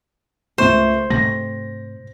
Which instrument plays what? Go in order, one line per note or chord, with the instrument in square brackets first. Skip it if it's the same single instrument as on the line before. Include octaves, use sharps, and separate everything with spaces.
[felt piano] C#2 A3 C#6 [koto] C5
[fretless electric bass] G#2 C3 A3 [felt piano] A#6